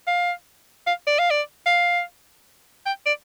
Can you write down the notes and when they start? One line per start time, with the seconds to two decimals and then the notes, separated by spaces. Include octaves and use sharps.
0.08 F5
0.87 F5
1.07 D5
1.19 F5
1.31 D5
1.66 F5
2.86 G5
3.06 D5